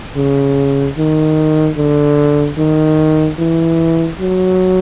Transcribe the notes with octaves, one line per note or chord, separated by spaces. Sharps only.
C#3
D#3
D3
D#3
E3
F#3